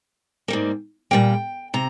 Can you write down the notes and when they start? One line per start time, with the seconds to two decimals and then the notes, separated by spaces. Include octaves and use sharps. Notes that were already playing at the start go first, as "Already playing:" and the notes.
0.48 G#2 G3 A#3
1.11 A#2 G3 A#3 G5
1.74 C3 A#5